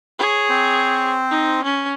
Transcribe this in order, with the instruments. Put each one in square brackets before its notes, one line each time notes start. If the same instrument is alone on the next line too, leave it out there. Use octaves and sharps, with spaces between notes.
[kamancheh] G#4 C#5
[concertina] C4 C5
[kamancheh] D#4
C#4